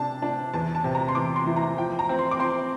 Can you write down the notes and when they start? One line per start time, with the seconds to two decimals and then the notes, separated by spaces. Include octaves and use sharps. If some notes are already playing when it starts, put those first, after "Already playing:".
Already playing: C3 D4 A5
0.22 D4
0.53 E2 A5
0.75 A5
0.84 C3
0.95 A#5
1.08 C6
1.15 E2 D6
1.36 C6
1.46 E3
1.56 A#5
1.77 F3 G5
1.99 A#5
2.09 C4
2.19 C6
2.31 D6
2.39 C4 C6